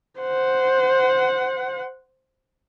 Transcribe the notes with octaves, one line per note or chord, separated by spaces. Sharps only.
C5 F#5